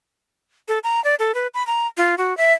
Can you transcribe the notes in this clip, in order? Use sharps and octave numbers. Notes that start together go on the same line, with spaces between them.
A4
A#5
D5
A4
B4
B5
A#5
F4
F#4
E5